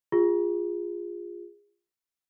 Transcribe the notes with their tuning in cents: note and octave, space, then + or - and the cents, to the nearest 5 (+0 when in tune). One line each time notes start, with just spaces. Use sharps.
F4 +0 G#4 -25